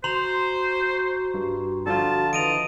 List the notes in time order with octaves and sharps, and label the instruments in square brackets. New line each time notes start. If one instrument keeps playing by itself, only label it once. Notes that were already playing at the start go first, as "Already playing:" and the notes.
[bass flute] F#4 [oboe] C5 [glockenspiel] A#5 C6 F7
[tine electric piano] G2
[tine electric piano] D3 F3 F4 [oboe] A5
[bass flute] E3 [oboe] D#5 [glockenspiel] D7 D#7 F7